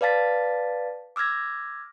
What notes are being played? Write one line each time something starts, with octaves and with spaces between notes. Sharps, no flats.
B4 D5 F5 A5 A6 B6
D6 E6 F6 G#6 A#6